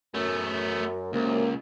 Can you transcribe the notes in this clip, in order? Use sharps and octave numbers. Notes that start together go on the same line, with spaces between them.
F#2 A3 B3
C#2 F#2 C3 A#3